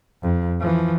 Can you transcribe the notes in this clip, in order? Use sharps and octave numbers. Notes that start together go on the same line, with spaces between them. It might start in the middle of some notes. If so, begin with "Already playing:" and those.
F2
E3 F3